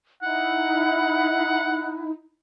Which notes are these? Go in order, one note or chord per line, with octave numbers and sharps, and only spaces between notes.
D#4 E4 F#5